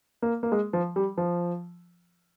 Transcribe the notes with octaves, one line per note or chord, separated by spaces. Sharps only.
A#3
A#3
G#3
F3
G3
F3